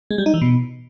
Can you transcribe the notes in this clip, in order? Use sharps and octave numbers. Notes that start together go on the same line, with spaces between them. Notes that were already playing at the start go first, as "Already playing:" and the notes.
G#3
G3
D#4
E3
B2